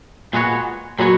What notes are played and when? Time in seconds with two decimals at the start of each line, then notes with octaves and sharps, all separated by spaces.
0.33 A#2 G#3 B3 F#4 C#5
0.98 A#2 F#3 G#3 B3 F#4 C#5